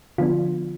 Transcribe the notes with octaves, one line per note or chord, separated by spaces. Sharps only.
D3 F3 B3 D4 F4